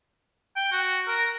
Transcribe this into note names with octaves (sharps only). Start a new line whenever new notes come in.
G5
F#4
A#4